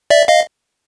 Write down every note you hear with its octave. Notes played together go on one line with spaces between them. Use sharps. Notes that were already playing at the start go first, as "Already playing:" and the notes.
D5 E5
D#5 F5